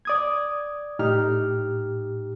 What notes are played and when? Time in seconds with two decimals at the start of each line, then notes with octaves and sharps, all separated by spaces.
0.05 D5 D#6 G#6
0.99 A2 D#4 G4 F6